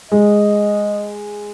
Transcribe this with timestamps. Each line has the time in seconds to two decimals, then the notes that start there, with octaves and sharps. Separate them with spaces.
0.12 G#3 D#5